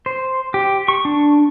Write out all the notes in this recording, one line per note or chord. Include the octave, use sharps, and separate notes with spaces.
C5
G4
C#6
D4